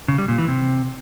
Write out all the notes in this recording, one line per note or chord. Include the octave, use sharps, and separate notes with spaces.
C#3
G3
A#2
E3
C3